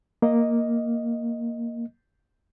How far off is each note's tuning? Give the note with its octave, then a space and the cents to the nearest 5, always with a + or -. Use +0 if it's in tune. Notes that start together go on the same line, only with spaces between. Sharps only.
A#3 +0 D#5 +0